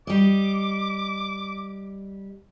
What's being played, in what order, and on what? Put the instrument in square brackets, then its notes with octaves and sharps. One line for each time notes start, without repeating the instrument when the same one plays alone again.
[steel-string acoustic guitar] G3 D#5 [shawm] D6